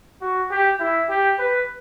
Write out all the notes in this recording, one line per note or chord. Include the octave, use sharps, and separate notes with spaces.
F#4
G4
E4
G4
B4